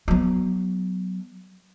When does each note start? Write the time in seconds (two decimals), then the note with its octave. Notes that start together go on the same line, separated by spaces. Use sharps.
0.08 F#3 B3